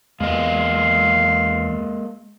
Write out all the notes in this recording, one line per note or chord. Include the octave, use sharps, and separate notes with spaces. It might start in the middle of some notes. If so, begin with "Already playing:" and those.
E2 G#3 A#3 D#5 F5